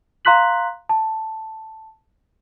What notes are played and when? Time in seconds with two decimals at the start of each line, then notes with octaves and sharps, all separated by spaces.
0.25 F5 A#5 C6 F#6 B6 F#7
0.89 A5